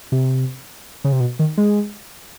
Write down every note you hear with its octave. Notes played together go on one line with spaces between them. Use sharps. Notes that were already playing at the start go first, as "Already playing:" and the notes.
C3
C#3
C3
B2
D#3
G#3